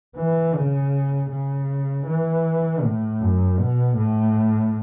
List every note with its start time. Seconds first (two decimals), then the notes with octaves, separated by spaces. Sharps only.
0.17 E3
0.54 C#3
1.31 C#3
2.07 E3
2.83 A2
3.21 F#2
3.59 B2
3.97 A2